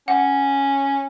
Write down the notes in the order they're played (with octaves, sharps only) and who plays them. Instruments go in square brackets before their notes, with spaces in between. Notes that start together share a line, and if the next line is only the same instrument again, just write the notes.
[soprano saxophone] C#4 [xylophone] F#5